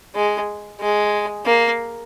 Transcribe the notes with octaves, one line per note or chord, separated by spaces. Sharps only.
G#3
G#3
A#3